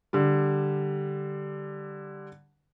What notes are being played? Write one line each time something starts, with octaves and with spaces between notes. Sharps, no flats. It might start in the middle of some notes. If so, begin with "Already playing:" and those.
D3 G3